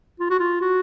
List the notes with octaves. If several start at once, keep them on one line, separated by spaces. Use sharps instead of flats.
F4
F#4
F4
F#4